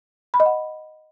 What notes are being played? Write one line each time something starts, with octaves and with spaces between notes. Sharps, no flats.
B5
D#5
F#5